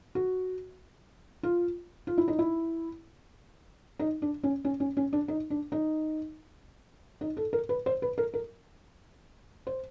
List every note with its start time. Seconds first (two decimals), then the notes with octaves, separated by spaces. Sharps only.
0.15 F#4
1.43 F4
2.07 F4
2.18 E4
2.28 D#4
2.39 E4
3.99 D#4
4.22 D4
4.44 C#4
4.65 C#4
4.80 C#4
4.97 C#4
5.13 D4
5.28 D#4
5.50 D4
5.72 D#4
7.21 D#4
7.37 A4
7.53 A#4
7.69 B4
7.86 C5
8.02 B4
8.18 A#4
8.34 A#4
9.67 C5